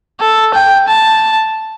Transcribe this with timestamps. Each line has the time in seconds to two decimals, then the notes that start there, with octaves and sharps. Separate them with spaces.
0.20 A4
0.54 G5
0.88 A5